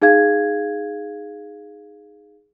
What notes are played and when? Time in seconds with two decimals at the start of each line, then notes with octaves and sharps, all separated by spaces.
0.02 D#4 G#4 F5 G#6